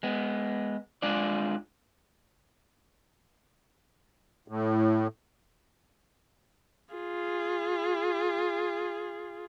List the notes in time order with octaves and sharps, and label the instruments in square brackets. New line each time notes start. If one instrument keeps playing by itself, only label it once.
[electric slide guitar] G#3 B3
G#3 D4 F4 G#4 D5
[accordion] A2
[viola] F4 G#4